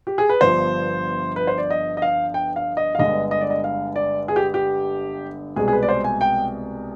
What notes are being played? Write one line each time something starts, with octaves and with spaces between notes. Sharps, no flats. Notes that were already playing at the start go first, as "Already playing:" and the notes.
G4
G#4
B4
G1 G2 F3 B3 C5
B4
C5
D5
D#5
D#5
F5
G5
F5
D#5
F5
G1 G2 D3 G#3 D#5
D#5
D5
D#5
F5
D5
G#4
G4
G4
C2 B2 G#3 C4 G#4
G#4
B4
D5
C5
G#5
G5